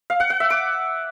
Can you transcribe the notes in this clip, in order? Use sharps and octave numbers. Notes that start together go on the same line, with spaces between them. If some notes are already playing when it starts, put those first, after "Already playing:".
F5
F#5
F#5
E5
D6